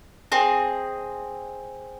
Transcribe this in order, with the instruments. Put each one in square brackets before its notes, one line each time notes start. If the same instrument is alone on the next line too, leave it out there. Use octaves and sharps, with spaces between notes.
[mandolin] C4 G#4 D#5